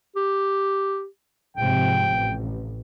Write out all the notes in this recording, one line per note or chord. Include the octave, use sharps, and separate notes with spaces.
G4
G#2 C3 F3 G5
A1